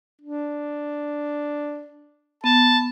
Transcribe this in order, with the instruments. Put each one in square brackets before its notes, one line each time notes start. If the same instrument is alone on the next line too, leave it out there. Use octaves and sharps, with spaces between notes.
[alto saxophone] D4
[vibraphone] B3 [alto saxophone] A5